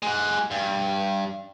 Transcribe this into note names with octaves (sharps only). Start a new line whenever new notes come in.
G#3 F#5
G2